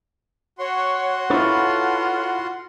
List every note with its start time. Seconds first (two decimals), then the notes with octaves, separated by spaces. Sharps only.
0.58 F#4 C#5 F#5 C6
1.30 E4 F4 A4 B4 C#5